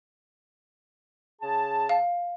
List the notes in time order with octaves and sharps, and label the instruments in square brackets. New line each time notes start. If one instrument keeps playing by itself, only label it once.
[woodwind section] C#3 G#4 A5
[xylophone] F5